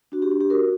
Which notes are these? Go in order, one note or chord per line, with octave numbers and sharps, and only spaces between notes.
D4 F#4
G4
D4
G4
F#4 A#4